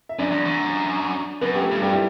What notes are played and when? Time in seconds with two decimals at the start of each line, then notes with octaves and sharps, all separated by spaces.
0.09 E5
0.19 F#2 D4 D5
0.31 E2
0.45 F#2
1.41 F#2 B3 B4
1.55 G4
1.61 A3 A4
1.72 G2
1.82 G3 G4
1.93 E4